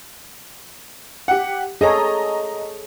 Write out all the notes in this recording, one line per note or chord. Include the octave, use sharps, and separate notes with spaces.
G4 F#5
G#4 A4 C#5 D#5 A#5